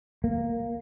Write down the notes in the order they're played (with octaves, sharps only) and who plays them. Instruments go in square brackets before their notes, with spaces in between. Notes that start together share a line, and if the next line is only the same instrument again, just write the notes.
[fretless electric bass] A#3